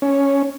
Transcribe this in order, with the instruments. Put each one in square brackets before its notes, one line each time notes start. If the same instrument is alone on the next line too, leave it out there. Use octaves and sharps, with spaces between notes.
[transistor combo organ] C#4